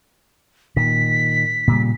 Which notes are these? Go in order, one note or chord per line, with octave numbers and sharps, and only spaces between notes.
A#2 D#3 B6
A#2 C#3 G3